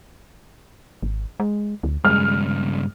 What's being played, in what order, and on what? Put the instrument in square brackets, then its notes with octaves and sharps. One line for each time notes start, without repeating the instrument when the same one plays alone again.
[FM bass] G#1
G#3
D2
[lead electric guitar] G2 C#3 [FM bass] G#3 [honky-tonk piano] F6